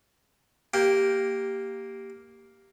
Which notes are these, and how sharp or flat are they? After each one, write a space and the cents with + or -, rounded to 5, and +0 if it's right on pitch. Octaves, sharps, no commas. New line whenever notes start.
A#3 +0 G4 +0